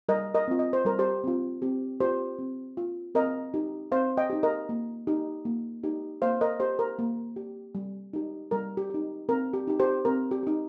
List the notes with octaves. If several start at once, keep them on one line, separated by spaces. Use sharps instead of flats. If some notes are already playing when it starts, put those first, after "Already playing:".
G3 A#4 D#5
A#4 D#5
C4 F4
D#5
C5
G3 A#4
G4 C5
C4 F4
C4 G4
F4 G4 C5
C4
F4
C4 A#4 D#5
D#4 G4
C4 C5 F5
D#5 G5
D#4 G4
A#4 D#5
A#3
D#4 G4
A#3
D#4 G4
A#3 C5 F5
A#4 D#5
G4 C5
A#4
A#3
G4
G3
D#4 G4
G3 A#4
G4
D#4 G4
C4 A#4
G4
D#4 G4
G4 C5
C4 A#4
G4
D#4 G4